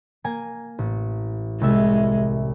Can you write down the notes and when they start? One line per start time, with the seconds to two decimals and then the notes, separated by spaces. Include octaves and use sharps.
0.24 A#3 G#5 A#6
0.79 A1
1.61 C2 G#3 E5 A6